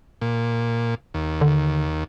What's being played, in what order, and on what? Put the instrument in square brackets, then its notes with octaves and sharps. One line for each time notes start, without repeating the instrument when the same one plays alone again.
[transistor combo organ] A#2
D#2
[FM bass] D3